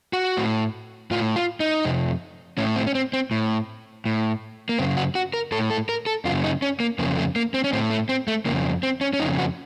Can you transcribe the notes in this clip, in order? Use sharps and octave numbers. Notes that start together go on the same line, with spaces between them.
F#4
A2
A2 F4
F4
D#4
F2 C3
A2 C#4
C4
C#4
C4
C4
A2
A2
A#3
F#2 C#3 C4
F#4
F#4
A#4
A2 A4
A4
A#4
A4
F#2 C#3 F4
D#4
C#4
A#3
F2 C#3 A#3
A3
A#3
C4
C#4
A2 C4
A3
C4
A3
F2 C#3 A#3
C4
C#4
C#4
F2 C#3 D#4
F#4